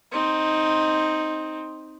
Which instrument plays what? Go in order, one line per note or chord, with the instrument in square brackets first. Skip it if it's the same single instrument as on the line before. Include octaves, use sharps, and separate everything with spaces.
[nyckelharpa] C4 D#4